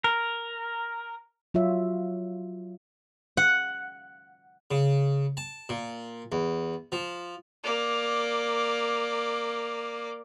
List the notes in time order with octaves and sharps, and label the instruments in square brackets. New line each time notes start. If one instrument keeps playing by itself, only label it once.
[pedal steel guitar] A#4
[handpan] F#3 F4 C#5 E5
[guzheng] F#5
[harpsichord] C#3
A5
A#2
E2
F3
[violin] A#3 D5